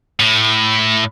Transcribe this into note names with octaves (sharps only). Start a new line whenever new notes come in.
A2